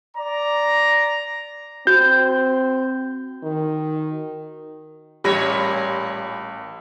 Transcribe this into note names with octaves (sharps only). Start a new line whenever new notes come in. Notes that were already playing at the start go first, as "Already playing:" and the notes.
D5 A#5
C4 F#4 G6
D#3
A1 A#2 G3 G4 C#5 B5 A#6